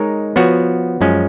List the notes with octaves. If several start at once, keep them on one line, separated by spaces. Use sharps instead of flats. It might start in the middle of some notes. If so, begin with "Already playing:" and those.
Already playing: G#3 D#4 A#4 C#5
F3 B3 F#4 C#5
F#2 F3 G#3 C#4